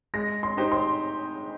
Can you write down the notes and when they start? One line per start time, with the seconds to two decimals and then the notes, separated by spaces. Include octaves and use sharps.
0.14 G#3 A#6
0.43 C6
0.57 D#4 G4 C5
0.72 C6